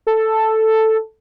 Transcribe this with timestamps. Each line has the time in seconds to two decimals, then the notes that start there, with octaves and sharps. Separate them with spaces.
0.07 A4